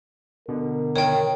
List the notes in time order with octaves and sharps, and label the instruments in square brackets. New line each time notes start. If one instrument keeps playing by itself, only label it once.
[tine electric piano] B2 D3 [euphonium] A#4
[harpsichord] D#3 [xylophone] C#5 G5